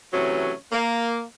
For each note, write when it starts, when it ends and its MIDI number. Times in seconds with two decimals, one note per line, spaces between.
0.13 0.52 48
0.13 0.52 52
0.13 0.52 54
0.13 0.52 57
0.13 0.52 61
0.72 1.22 58